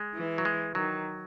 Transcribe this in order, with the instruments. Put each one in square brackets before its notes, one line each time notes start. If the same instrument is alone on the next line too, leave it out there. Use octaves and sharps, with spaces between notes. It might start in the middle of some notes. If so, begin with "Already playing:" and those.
Already playing: [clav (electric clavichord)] G#3
[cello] E3
[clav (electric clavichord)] F#3
G#3
[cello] D#3 [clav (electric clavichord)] F#3